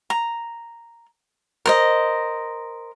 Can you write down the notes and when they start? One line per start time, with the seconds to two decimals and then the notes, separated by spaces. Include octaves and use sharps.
0.10 A#5
1.66 A#4 C5 D#5